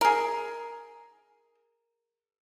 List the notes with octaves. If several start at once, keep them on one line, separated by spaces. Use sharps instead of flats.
G#4 A#4